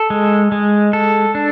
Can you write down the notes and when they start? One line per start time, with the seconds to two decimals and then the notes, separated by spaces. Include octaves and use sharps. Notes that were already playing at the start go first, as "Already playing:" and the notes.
Already playing: A4
0.10 G#3
0.52 G#3
0.93 A4
1.35 D4